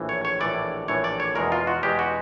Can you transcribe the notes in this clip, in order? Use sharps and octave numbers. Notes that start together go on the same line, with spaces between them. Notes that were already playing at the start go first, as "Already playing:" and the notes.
Already playing: A#1 A2 E3
C#5
C#5
A#1 A2 E3 D5
A#1 A2 E3 C#5
D5
C#5
E2 B2 G#3 A#4
F4
F#4
E2 B2 G#3 G4
F#4